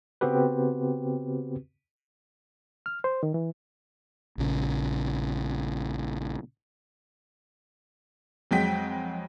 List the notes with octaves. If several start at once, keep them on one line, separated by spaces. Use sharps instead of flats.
C#3 B3 C4 F#4 G4 B4
F6
C5
D#3
E3
A#1 C#3
F2 F#3 G#3 G5 B6